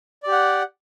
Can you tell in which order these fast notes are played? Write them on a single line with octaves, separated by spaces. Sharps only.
D5 G4 F#5